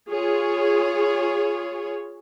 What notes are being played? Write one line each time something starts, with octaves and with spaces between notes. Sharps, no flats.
F4 G#4 C#5